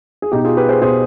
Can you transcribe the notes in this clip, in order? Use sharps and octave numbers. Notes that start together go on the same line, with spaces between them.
G#4
B2 D#4 G4
F4 G#4
G4 B4
G#4 C5
B2 G#4 C5